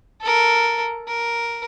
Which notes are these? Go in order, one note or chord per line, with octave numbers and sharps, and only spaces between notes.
A4 A#4
A#4